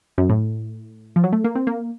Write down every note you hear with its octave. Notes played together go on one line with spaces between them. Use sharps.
F#2
A2
F3
F#3
A3
A#3
C4
A#3